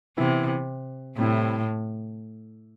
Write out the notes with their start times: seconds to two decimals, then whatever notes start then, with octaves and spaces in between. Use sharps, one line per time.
0.17 C3 E3 B3 E4
1.17 A2 C3 G3 C4 E4